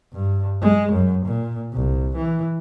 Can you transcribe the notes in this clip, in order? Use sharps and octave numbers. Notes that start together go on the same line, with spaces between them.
G2
G#3
F#2
A#2
C2
E3